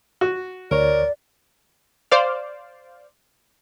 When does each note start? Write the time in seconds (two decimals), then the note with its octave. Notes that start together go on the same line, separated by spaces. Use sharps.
0.21 F#4
0.71 D2 A#4 C#5 D5
2.11 C5 D5 F5